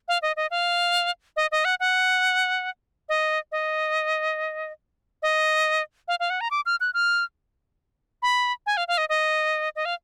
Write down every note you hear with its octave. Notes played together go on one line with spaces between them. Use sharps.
F5
D#5
D#5
F5
D#5
D#5
F#5
F#5
D#5
D#5
D#5
F5
F5
F#5
A#5
D6
F6
F#6
F6
B5
G#5
F5
F5
D#5
D#5
D#5
F5